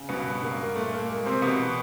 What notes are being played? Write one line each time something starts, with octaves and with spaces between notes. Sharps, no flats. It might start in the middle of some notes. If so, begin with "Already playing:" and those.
Already playing: C#3
G2 B2 B3
G2 A#3
A#2 A3
A#3
G#3 A#3
C3 C4
B2 E3 B3